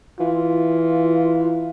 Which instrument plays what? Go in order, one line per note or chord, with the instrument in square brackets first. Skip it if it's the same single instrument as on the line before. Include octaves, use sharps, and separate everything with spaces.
[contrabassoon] E3 [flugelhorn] F4